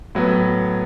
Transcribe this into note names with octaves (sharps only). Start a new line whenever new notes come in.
A2 F#3 B3